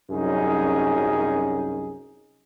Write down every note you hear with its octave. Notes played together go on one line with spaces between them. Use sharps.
C2 F#2 F#3 C#4 D#4 G#4